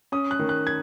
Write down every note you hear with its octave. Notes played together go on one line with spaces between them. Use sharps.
C#4 D#6
F#6
D#3
F#6
G#6